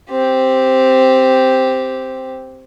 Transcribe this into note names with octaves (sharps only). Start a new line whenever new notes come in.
C4 G4